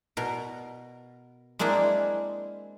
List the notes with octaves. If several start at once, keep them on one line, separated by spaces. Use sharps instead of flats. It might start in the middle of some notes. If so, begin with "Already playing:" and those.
B2 A#4
G#3 A#3 C4 D4 E4